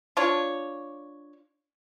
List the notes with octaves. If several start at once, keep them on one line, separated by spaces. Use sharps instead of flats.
D4 F4 C#5